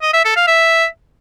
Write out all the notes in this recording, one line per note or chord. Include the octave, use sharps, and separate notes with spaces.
D#5
E5
A4
F5
E5